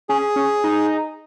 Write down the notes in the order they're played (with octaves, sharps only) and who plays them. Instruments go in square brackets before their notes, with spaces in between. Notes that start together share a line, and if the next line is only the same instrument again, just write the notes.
[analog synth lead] C#4 [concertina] G#4
[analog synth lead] C#4
D#4